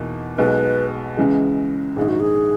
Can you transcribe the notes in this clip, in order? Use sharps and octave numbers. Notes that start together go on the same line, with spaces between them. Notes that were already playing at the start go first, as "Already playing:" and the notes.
Already playing: E2 B2 A#3 D#4
B1 B2 G#3 B4
C#2 C#3 E3 G#3
A#1 G#2 D#3 G#4
F#4
G#4